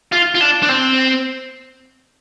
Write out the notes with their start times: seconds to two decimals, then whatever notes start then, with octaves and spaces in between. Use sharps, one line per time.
0.12 F4
0.35 F4
0.41 D4
0.63 D4
0.69 C4